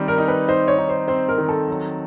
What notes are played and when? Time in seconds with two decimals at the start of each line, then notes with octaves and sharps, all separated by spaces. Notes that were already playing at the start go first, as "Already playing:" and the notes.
Already playing: D#3 G3 C4
0.08 A#4
0.18 D#4
0.28 B4
0.48 D#4 C5
0.68 C#5
0.79 D#4
0.89 C5
1.08 C4 C5
1.29 A#4
1.38 D#3
1.49 A4
1.68 F#3